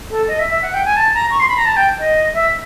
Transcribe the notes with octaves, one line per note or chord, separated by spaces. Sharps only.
A4
D#5
E5
E5
F#5
G5
G#5
A5
A#5
C#6
C6
B5
A#5
A5
G5
D#5
E5